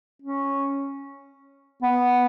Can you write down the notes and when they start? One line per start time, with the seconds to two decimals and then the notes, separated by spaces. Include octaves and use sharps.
0.22 C#4
1.82 B3